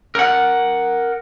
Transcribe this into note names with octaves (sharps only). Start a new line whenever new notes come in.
A#4 F#5